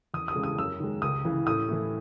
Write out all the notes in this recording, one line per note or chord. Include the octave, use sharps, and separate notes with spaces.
E2 D#6
D#6
C#3 E3 G#3
D#6
F#2 E6
D#3 G#3
C#2 D#6
C#3 E3
A2 D#6
E3 A3